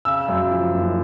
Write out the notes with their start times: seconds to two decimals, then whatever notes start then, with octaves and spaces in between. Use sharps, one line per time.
0.05 C#3 E6
0.28 F#2
0.51 F3
0.75 F#1